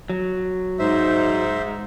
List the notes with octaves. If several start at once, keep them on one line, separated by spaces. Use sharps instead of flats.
F#3
G#2 D#4 C5 E5